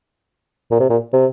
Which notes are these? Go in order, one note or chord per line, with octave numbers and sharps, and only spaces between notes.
A#2
C3
A#2
C3